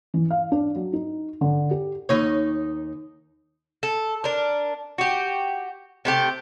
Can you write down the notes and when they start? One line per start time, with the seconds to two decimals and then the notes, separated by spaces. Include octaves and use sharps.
0.14 E3
0.30 F5
0.52 D4
0.76 F#3
0.93 D#4
1.41 D3
1.71 G4
2.09 D#2 D#4 C#5
3.83 A4
4.24 D4 A#4
4.98 F#4 G4
6.05 C3 A3 G4